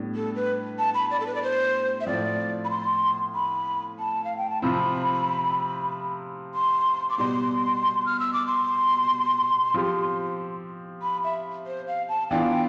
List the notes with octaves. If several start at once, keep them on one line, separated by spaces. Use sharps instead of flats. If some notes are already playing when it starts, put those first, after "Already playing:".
Already playing: A2 G3 B3 D4
A4
B4
A5
B5
D5
A4
B4
D5
C5
E5
A2 F3 C4 D5
B5
C6
B5
A5
F5
G5
A5
C3 F3 C4 B5
C6
D6
B2 G3 B3 C6
F6
E6
D6
C6
F3 C4 G4
B5
E5
C5
F5
A5
E3 B3 D4 F4 G5